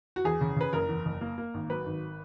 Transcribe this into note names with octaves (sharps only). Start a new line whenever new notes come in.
F#4
E2 G#4
C#3
C#3 B4
F#1 A#4
E2
F#1
A#3
A#3
G#1
F#3 B4
G#1